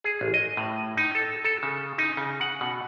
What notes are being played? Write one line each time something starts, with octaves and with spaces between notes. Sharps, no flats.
G#4
A1
D#5
A2
D#4
A4
A4
C#3
D#4
C#3
F#5
B2